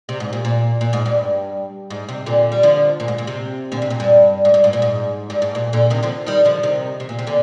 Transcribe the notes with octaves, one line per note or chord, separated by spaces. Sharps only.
C3
G#2
A#2
A#2
A#2
G#2
G2
G#2
C3
A#2 D3
G3
D3 F3
A#2
G#2
A#2
C3
A#2 D3
C3
A#2
G2
G#2
G2
G#2
A#2
G#2
G2
G#2
A#2
A#2 D3
C3 D#3
D3 F3
D#3 G3
D3 F3
C3 D#3
C3
A#2
C3
A#2 D3